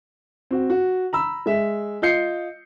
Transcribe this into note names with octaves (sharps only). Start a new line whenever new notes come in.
C4 F#4
F#4
A#5 B5 E6
G#3 E5
F4 D#5 G6 C7 C#7